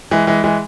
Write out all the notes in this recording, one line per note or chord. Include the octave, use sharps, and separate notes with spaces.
E3 G#3
E3 G#3
E3 G#3